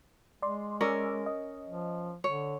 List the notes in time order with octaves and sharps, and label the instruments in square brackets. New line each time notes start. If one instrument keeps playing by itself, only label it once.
[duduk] G#3 [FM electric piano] D5 C6
[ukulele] C#4 A#4 [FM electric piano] C#5 D5 E6
[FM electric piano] D#5
[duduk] F3
[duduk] D3 [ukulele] C#5